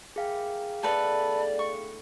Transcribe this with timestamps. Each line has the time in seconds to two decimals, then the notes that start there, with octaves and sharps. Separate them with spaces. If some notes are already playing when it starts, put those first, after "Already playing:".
0.16 E4 G#4 A#4 F5 G5
0.83 A2 D3 B3 A4 B4 D5
1.59 C#6